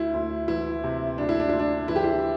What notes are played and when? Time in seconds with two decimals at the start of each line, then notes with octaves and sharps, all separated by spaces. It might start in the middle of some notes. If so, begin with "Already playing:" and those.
Already playing: D2 E4
0.14 D2
0.48 E3 E4
0.84 C3
1.18 D2 D4
1.29 E4
1.40 D4
1.49 D2 E4
1.59 D4
1.88 E3 E4
1.96 G4
2.04 E4